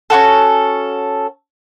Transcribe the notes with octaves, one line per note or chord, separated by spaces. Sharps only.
C#4 F4 F#4 A4